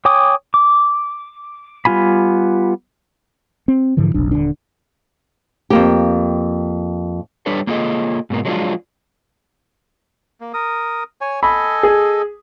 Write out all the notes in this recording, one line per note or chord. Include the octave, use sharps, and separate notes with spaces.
C#5 G5 G#5 D6 D#6
D6
G3 B3 F4 G#5 B5
C4
G#2 D3 E3 F3
F1 B1 D4
D#1 G#1 D3 D4
F2 A#3 G4
G3 D4 A4 B4 C#5
A#3 D4 F4 G#4 A4 D#5
G#2 B2 A#3
F3 F#3 G#3 C#4 D4 F4
A#3
A#4 D#6
C#5 G#5
A4 D#5 G#5 B5
G#4